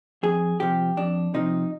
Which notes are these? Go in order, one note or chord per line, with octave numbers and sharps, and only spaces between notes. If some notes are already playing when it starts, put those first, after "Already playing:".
F2 G#4
C3 F3 G4
F2 D4
C3 F3 D#4